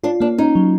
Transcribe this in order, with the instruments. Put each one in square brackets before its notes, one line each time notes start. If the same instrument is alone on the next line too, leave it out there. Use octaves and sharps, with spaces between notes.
[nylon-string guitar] D4 [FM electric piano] F4
[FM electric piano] A#3 [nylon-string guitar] D4
[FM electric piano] C#4 [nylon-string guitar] D#4
[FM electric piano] F#3